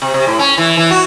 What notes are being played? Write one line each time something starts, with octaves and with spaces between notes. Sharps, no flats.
C3
C3
A2
C#4
E3
E3
F#4